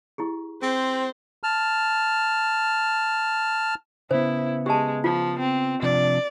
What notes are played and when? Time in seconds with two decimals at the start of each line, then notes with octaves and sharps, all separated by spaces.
0.18 E4 G4 G#4
0.62 C4 G#4 C5
1.43 A5 F6
4.11 C#3 B3 E4 C5
4.66 G#3 G4 A5
5.04 F3 F4
5.39 C4
5.82 C3 F3 D4 D5